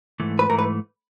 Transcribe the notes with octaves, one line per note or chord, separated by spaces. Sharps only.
G#2 E3 A3
B4
G#2 E3 A3 A#4
B4